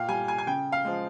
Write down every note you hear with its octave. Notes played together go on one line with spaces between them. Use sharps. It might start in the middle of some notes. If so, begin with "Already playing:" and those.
Already playing: A#2 F5 G5
G3 G#5
G#5
G#5
C#3 G5
F5
F3 G#3